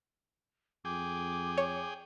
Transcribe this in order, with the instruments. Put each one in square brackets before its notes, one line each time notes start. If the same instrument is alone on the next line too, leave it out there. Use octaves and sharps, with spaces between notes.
[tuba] F2 [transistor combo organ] G#4 G5 [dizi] D6
[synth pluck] C#5